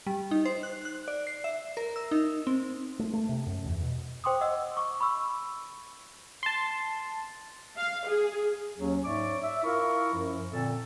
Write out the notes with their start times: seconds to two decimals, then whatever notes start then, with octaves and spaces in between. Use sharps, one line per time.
0.07 G3
0.31 D#4
0.45 C5
0.63 F#6
0.85 F#6
1.08 D5
1.27 C7
1.44 E5
1.77 A#4
1.96 E6
2.11 D#4
2.47 C4
2.99 A3
3.13 A3
3.29 C3
3.46 F#2
3.66 E2
3.82 B2
4.24 C5 G5 C6 D6 D#6
4.41 D#5 F#5 E6
4.77 C#6 D6
5.00 B5 C#6 E6
6.43 A5 C6
7.77 F5
8.08 G#4
8.79 D#2 F#3 C#4
9.05 G#2 C#5 D5 E5 D6
9.43 E5
9.64 E4 F4 A#4 C#6
10.14 F#2 F3
10.52 A#2 D3 C4 A4